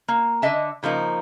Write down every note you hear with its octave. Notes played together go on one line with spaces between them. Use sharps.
A#3
D3 D#5 E5 A5
C#3 F3 A#3 D#4